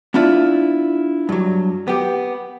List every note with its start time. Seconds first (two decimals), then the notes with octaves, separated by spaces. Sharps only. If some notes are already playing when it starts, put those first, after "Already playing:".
0.14 B3 D4 E4 F4 D5
1.29 G2 F#3
1.88 B3 G4